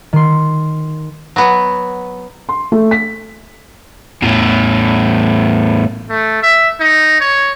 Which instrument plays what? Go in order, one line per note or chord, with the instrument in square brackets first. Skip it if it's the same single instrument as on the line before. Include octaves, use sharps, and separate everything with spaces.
[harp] D#3 C6
[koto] F#3 B3
[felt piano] C6
A3
B6
[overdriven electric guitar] E2 A2
[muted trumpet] A3
E5
D#4
C#5